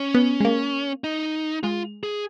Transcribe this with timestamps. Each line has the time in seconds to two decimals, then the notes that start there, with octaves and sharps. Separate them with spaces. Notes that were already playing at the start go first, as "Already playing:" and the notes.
Already playing: C#4
0.14 B3
0.40 G#3
0.45 A#3
1.04 D#4
1.63 G#3 F4
2.03 G#4